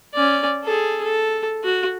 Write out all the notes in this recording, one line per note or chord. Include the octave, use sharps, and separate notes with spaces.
C#4 D5
G#4 A4
A4
F#4